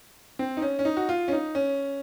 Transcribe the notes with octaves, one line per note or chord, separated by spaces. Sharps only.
C4
D#4
C#4
C#4
D#4
F#4
F4
C#4
D#4
C#4